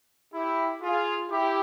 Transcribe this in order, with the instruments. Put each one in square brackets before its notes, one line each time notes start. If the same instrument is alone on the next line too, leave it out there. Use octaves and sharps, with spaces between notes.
[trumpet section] E4 G4
F4 G#4
E4 G4